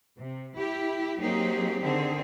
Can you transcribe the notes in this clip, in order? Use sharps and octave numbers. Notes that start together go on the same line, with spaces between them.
C3
E4 G4
F#3 A#3 C4 D#4 G4 G#4
D3 D#3 C4 G#4